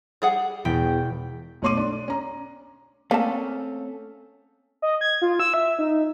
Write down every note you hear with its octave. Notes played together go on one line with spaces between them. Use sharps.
G3 G#4 F#5
E1 E2 G5 B6
B1 A3 C#5 C6 D6 D#7
D4
C#4 A#5
A3 A#3 C4 C#4 A5
D#5
G#6
F4
E6
E5
D#4